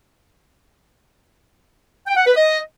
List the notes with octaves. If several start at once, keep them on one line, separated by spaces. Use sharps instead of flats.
G5
F#5
B4
D#5